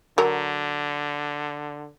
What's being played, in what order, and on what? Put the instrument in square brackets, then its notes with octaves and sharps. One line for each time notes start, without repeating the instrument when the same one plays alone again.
[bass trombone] D3 [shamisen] F#3 A#4